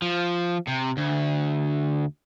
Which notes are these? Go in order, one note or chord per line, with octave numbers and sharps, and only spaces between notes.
F3
C3
D2